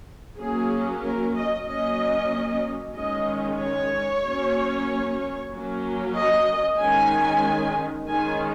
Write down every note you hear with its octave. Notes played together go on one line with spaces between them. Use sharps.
F#3 A#3 C#4 G#4
A#4
D#5
F#3 A#3 C#4 D#5
D#3 G#3 C#4 D#5
C#5
F#3 A#3 C#4
F#3 A#3 C#4
D#5
D#3 G#3 C#4 G#5
D#3 G#3 C#4 G#5